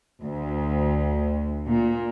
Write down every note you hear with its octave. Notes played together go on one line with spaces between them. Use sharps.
D2
A#2